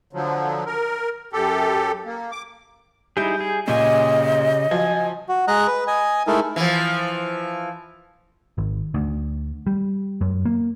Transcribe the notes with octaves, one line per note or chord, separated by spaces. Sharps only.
D3 F3 F#3
A#4
F#2 G4 A4
A#3
D6
G3 D#4 E4 G#4 G6
G#4
A#2 C#3 G4 D#5 G#5
F3 F#3 G#5
F#4
G#3 D#5 A#5 F#6
B4
D#5 G#5
G#3 A3 D#4 E4 A4 A#4
E3 F3
G#1
D2
G3
F#2
A#3